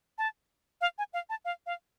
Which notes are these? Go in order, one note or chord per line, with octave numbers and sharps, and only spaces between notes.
A5
F5
G#5
F5
A5
F5
F5